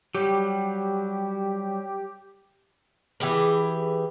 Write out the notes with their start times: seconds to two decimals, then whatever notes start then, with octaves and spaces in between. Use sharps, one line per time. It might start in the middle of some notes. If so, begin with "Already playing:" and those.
0.15 F#3 G3 G4
3.20 E3 G4 G#4 B4